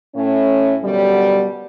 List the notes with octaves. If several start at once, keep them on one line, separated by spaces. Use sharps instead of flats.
A2 C#4
F#2 B2 D3 G3